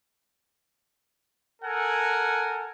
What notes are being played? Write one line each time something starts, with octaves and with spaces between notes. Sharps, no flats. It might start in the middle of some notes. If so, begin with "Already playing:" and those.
A4 A#4 F#5 G#5